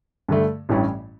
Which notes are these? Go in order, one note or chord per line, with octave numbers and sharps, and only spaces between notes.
G2 D3 A3
A1 G2 E3 G3 C#4